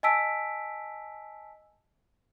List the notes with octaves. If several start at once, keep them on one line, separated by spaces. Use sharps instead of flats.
D#5 G#5 A5 E6 B6 D7